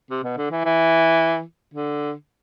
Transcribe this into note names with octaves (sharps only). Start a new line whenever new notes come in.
C3
B2
D3
E3
E3
D3